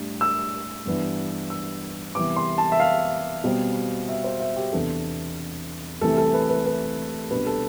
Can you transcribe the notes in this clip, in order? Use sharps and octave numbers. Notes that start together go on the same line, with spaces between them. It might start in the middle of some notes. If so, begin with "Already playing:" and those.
Already playing: A2 G3 D4
E6
G2 E3 B3 D4
E6
C3 E3 G3 B3 D6
C6
A5
E5
F5
B2 G3 C4
E5
C5
E5
G4
E2 C3 E3 B3 D4 A4
C2 C3 E3 A3 A4
A4
B4
B4
B4
C2 B2 G3 D4 B4
A4